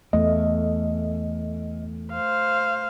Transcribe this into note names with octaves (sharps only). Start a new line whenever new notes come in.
E2 A3 D#5
C5 F5